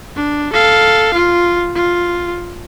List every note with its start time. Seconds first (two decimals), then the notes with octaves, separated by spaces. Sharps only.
0.16 D4
0.53 A4 F5
1.14 F4
1.75 F4